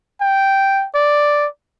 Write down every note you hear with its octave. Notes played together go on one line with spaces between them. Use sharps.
G5
D5